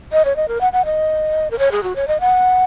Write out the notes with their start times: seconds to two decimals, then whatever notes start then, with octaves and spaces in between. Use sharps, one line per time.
0.12 D#5
0.25 C#5
0.36 D#5
0.48 A#4
0.61 F#5
0.73 F#5
0.85 D#5
1.51 A#4
1.59 C#5
1.72 G#4
1.83 F#4
1.96 C#5
2.08 D#5
2.20 F#5